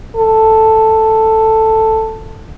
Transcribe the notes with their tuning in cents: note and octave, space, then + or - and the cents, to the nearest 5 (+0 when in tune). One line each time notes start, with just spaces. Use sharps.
A4 +5